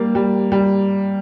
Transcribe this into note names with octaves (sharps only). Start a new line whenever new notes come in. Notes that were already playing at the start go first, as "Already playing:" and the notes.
Already playing: G3 A#3
G3
G3